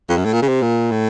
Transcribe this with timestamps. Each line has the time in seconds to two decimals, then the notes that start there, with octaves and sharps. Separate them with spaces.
0.09 F2
0.17 F#2
0.25 A2
0.33 A#2
0.42 C#3
0.48 C3
0.62 A#2
0.91 A2